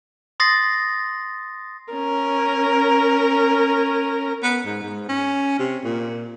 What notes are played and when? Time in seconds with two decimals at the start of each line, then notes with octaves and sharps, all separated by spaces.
0.40 C6 D#6 A6 A#6 C7
1.93 C#4 A#4
4.43 B3
4.65 G#2
4.83 G#2
5.09 C#4
5.59 C3
5.84 A#2